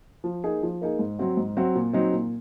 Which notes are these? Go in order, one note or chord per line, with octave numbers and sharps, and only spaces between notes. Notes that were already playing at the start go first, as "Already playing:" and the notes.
F3
A#3 D#4 G#4
F3
A#3 D#4 G#4
G#2
F#3 C4 F#4
G#2
F#3 C4 F#4
A#2
F#3 C4 D#4
A#2